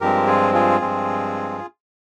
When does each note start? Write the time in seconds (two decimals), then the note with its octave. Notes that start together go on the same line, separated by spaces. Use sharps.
0.01 G2 F3 G#3 C4 G4 A#4
0.27 F4 G#4
0.54 F4 G#4
0.81 G2 F3 G#3 C4